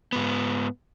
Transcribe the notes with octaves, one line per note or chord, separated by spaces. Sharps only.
G#2 B3